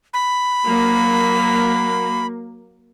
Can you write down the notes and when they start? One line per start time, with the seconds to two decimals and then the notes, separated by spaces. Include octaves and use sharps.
0.14 B5
0.66 F#3 A#3